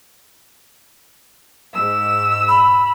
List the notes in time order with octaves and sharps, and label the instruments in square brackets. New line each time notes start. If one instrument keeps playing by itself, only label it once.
[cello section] G#2 [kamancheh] E6
[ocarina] B5